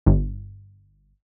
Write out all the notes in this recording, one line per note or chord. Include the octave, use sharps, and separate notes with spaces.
G1